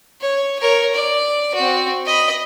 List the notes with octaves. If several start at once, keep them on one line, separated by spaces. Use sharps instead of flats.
C#5
A#4 C#5
D5
C4 F#4
D#5 B5